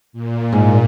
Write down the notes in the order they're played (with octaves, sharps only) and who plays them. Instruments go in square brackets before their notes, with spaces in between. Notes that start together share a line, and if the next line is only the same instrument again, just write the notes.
[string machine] A#2
[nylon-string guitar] G#2